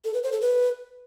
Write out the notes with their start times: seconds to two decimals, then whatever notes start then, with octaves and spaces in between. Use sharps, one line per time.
0.05 A4
0.14 B4
0.23 C5
0.32 A4
0.42 B4